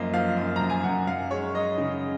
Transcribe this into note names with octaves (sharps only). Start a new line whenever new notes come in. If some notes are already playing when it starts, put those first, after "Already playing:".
Already playing: F#2 F3 A#3 D#5
F3 F5
F#2
F#2 A#5
G#5
F#2 F#5
F#2 F5
G#3 C#5
G#3 D#5
C#3